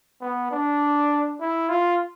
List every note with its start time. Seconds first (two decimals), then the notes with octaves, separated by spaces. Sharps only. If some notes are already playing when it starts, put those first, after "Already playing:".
0.21 B3
0.51 D4
1.40 E4
1.69 F4